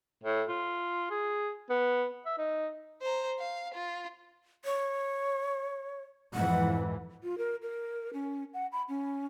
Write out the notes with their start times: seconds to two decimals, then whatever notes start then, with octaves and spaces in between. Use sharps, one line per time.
0.24 A2
0.48 F4
1.11 G#4
1.70 B3
2.26 E5
2.38 D#4
3.02 C5 A#5
3.39 F5
3.74 F4
4.65 C#5
6.34 F2 G#2 E3 F#5
7.23 F4
7.38 A#4
7.62 A#4
8.13 C#4
8.54 F#5
8.72 B5
8.89 C#4